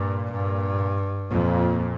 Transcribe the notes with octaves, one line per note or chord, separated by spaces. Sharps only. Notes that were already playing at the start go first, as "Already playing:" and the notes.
Already playing: G2 A#2
G2
F2 A#2